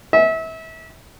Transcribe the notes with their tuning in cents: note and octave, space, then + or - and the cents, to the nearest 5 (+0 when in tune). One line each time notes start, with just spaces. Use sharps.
E5 -30